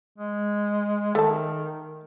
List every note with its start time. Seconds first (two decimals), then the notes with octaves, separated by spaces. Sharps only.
0.18 G#3
1.15 D#3 A3 A5